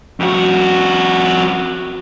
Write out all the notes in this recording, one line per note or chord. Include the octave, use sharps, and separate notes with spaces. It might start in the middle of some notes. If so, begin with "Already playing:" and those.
F2 F#4